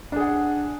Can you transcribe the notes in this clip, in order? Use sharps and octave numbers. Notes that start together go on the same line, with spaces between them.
D4 G#4 F#5